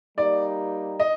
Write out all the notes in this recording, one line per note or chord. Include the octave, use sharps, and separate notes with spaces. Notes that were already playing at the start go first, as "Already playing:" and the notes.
G3 A#3 D#4 G4 D5
D#5